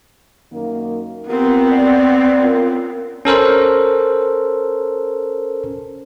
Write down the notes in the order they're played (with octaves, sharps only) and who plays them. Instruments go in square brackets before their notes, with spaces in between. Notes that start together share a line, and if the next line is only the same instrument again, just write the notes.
[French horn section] F#2 D#3 A#3
[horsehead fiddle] B3 C4 [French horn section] F4 G4 A#4
[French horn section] D5
C#4 F4 A#4
[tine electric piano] C#4 A4 A#4 C5